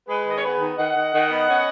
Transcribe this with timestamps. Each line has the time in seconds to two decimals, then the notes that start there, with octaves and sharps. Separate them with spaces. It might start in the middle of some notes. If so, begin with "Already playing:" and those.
0.08 G#3 G#4 B4
0.27 D#3 D#5
0.36 C#5
0.43 B3 G#4 B4
0.60 D#3
0.78 D#3 D#5 F#5
0.95 D#3
1.13 D#3
1.30 B3
1.48 C#4